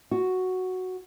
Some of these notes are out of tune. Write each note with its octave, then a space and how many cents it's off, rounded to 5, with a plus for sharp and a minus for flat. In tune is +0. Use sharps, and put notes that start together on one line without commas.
F#4 +0